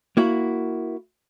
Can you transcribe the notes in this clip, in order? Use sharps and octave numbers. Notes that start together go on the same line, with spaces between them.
A#3 E4 F#4